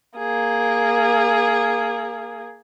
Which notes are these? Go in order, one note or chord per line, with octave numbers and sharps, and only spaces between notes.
A#3 G#4